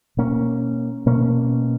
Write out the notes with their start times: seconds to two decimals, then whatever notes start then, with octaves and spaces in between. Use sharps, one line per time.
0.17 B2 A#3 C#4
1.06 B2 A#3 C#4